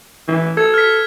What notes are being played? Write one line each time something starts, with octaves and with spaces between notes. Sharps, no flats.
E3
A4 G#6
F6 B6